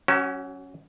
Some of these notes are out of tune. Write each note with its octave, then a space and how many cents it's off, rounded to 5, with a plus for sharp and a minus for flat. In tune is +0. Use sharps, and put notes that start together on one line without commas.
F#3 +0 C#4 +0 F#4 +40